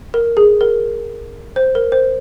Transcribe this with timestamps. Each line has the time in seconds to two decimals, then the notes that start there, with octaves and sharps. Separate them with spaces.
0.14 A#4
0.37 G#4
0.61 A#4
1.56 C5
1.75 A#4
1.92 C5